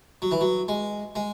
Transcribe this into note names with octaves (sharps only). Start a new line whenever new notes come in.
F#3
E3
F#3
G#3
G#3